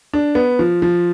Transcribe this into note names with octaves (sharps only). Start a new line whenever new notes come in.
D4
B3
F3
F3